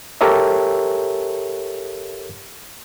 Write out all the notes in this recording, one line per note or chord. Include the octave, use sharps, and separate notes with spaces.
G4 A4 A#4 C#5 E5